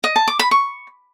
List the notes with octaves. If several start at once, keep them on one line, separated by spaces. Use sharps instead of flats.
D#5
A5
D6
B5
C#6